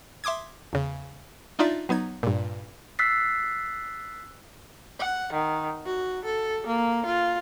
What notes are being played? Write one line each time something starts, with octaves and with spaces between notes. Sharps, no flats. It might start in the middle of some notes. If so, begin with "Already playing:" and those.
E5 C6 D6 D#6 G#6
E2 C#3
D4 D#4 F4 D5 E5
F#3 B3 D#4 G#6
G2 A#2
E6 F#6 A6 B6 C7
F#5
D#3
F#4
A4
A#3
F4